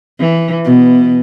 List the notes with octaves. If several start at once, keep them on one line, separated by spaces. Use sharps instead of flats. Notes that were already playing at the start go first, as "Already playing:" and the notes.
E3
B2